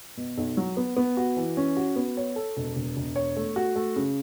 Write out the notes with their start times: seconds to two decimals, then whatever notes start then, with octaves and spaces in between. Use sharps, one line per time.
0.17 B2
0.38 B1
0.57 F#3
0.77 B3
0.97 B3
1.17 F#4
1.37 E3
1.57 C#4
1.77 F#4
1.96 B3
2.17 C#5
2.36 A4
2.57 E1
2.76 E1
2.97 E1
3.16 C#5
3.36 A3
3.56 F#4
3.76 A3
3.96 C#3